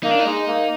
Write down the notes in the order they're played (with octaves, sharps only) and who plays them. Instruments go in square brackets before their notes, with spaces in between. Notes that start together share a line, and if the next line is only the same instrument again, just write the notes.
[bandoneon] A#3 [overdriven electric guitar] D#4
[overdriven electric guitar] D4
D#4
[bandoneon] G#3
A#3